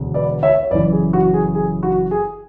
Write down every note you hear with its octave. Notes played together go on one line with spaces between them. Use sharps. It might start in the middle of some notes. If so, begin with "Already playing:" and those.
Already playing: E1 D2 D3
B4 D5
C#5 E5
C#5
F#1 F#2 E3 B4 D5
G#4
F#4
G#4
G#4
F#4
G#4